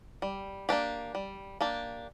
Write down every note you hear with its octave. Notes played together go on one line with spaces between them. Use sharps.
G3
A#3 D4 G4
G3
A#3 D4 G4